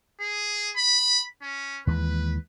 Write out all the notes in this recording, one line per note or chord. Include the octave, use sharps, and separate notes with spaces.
G#4
B5
C#4
D#2 E3 G#3 B4